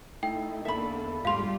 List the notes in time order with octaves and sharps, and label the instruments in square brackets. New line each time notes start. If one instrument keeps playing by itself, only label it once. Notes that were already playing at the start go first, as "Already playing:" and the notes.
[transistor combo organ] A3 D#4 E4 [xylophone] G5
[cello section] E2 D3 A#3 [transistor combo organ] A4 [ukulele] E5 B5
[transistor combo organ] G#2 [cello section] G3 F4 G4 [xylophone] F5 C6